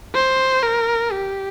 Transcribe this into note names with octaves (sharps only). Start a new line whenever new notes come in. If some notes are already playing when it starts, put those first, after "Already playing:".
C5
A#4
G4